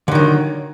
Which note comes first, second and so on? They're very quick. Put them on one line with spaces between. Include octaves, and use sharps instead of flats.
D3 D#3 F#3